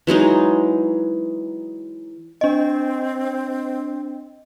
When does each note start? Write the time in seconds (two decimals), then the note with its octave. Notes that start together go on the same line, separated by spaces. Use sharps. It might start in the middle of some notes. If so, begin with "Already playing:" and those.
0.07 E3 F#3 G#3 D#4
2.41 C4 D4 D#5